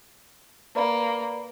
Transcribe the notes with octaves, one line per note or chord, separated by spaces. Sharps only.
A#3 B4 D5 B5